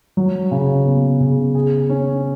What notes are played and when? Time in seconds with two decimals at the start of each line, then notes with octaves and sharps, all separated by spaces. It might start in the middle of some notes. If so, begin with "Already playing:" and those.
0.17 F#3
0.51 C#3
0.86 B3
1.20 C#3
1.55 G#4
1.89 C#4